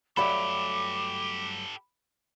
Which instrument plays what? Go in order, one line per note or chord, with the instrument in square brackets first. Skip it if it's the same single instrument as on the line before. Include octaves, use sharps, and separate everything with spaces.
[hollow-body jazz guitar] G2 F#3 A3 [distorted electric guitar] G4 A4 [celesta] B5 [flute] D6